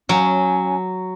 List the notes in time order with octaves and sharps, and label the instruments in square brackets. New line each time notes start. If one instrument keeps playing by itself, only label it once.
[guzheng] F#3 [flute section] C#4 G#5